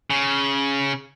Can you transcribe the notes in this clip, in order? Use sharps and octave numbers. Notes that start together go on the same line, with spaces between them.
C#3